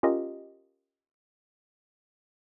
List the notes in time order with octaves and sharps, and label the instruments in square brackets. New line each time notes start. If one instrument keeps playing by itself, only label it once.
[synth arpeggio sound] C#4 F4 G4 A#4 D#5